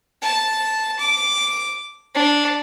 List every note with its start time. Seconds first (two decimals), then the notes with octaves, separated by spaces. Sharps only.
0.22 A5
0.99 D6
2.15 D4